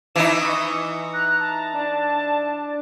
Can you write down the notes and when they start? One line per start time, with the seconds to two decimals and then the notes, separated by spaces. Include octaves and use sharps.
0.16 E3 D#4 E5 E7
0.40 C#6 D#6
1.14 A#5 F#6
1.40 A5
1.74 D4